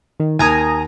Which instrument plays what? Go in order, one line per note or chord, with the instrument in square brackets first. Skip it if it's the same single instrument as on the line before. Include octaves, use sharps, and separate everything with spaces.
[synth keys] D#3
[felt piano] D#2 A#4 G#6 [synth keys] G#5 A#5 D#6